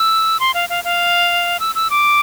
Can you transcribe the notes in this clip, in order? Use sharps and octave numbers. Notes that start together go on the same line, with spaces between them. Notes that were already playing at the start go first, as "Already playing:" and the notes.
Already playing: E6
C6
F5
F5
F5
E6
E6
D6